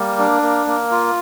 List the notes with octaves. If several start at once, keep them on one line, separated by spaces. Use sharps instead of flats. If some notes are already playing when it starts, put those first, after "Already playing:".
Already playing: G3 A#3
D4
A#3
A#3
F4